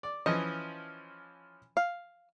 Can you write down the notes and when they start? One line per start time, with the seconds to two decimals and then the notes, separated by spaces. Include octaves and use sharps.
0.03 D5
0.26 E3 F3 C#4 D#5
1.77 F5